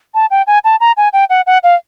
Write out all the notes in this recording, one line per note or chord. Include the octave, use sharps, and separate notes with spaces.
A5
G5
G#5
A5
A#5
G#5
G5
F#5
F#5
F5